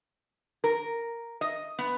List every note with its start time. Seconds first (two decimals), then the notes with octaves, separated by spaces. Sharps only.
0.64 A#4
1.41 D#5
1.79 B3